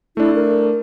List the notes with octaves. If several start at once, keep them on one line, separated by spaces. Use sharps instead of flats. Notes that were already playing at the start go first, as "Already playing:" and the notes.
A3 D4 E4
A#4